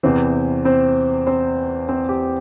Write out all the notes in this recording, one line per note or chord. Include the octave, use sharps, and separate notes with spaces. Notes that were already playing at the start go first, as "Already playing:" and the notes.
E2 C3 E3 C4 C5
C4 C5
C4 C5
C4 C5
G4